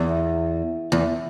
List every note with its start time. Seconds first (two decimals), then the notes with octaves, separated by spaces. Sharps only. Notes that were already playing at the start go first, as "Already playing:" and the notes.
Already playing: E2
0.92 E2